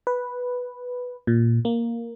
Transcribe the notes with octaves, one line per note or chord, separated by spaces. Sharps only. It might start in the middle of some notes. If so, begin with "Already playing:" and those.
B4
A#2
A#3